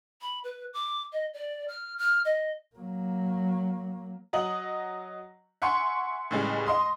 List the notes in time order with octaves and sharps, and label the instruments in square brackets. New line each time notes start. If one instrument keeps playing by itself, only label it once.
[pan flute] B5
B4
D6
D#5
D5
F6
F6
D#5
[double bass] F#3 A#3
[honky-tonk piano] F#3 D#5 F#7
E5 F#5 G#5 C6 C#6
A2 C#3 E3 G3 G#3
D#5 C6 D#6